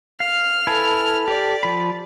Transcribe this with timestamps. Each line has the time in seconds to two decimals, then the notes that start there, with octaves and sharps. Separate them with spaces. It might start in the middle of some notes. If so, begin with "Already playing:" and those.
0.20 F5 F6
0.67 E4 A4 B4 G#5 A5
1.28 G4 D5
1.63 F3 B5